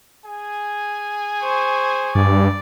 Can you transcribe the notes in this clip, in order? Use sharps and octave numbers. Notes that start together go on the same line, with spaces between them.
G#4 G#5
C5 C#6
G2 D5